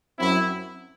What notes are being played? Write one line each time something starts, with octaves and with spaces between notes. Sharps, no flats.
F#2 F#3 C4 E4